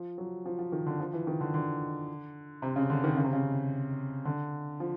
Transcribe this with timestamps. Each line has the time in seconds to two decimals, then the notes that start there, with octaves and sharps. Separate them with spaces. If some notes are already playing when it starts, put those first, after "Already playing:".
Already playing: F3
0.18 F#3
0.45 F3
0.59 F3
0.72 D#3
0.86 D3
1.00 F3
1.13 E3
1.27 D#3
1.41 D3
1.54 D3
2.62 C3
2.76 C#3
2.90 D3
3.04 D#3
3.17 C#3
3.25 C3
3.33 C#3
4.25 D3
4.80 F3